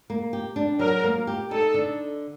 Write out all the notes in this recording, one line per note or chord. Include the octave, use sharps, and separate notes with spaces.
A#3
G4
D4
F#3 A#4
A#3
G4
D#4 A4
D3